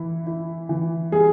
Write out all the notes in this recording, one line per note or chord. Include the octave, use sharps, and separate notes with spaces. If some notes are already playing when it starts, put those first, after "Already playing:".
Already playing: E3 E4
E4
E3
G3 G#4